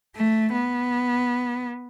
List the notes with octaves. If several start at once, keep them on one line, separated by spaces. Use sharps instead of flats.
A3
B3